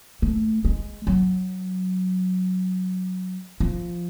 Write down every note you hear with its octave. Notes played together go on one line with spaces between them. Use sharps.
A3
G#3
F#3
F3